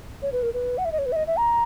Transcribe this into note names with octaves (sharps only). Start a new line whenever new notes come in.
C#5
B4
A#4
B4
F#5
E5
D#5
C#5
B4
E5
D#5
E5
A#5